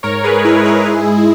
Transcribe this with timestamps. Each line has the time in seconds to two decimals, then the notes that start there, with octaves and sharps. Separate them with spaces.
0.03 G#2 A#4 C#5
0.24 G#4 B4
0.45 G#3 E4 G#4
0.65 E4 G#4
0.86 G#2